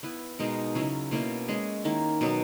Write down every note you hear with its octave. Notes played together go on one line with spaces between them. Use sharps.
B3 E4 B4
B2 G#3 D#4 A#4
C#3 F#3 C#4 E4
B2 A#3 C#4 E4
G#3 C#4 G#4
D#3 A#3 E4
B2 F#3 B3